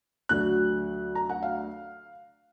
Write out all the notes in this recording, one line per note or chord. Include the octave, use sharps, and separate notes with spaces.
D2 D3 F#3 F#6
A#5
F#5
F5